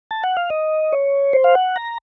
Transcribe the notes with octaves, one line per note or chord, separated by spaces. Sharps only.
A5
F#5
F5
D#5
C#5
C5
F5
F#5
A#5